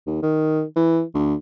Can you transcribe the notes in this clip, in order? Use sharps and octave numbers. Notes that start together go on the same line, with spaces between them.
D#2
D#3
E3
D2